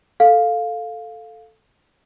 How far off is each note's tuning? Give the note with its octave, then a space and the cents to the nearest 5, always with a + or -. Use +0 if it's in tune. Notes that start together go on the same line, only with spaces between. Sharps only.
A4 +0 F5 +5